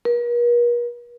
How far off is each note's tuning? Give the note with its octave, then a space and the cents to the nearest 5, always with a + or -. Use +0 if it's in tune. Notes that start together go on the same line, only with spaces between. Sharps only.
A#4 +45